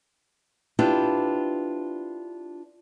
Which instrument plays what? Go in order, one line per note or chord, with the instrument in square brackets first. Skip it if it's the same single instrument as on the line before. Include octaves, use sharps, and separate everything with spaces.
[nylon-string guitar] D4 E4 F4 G4 B4 C5